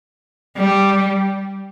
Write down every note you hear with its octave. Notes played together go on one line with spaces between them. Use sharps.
G3